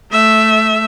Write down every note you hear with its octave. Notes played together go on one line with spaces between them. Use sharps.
A3 E5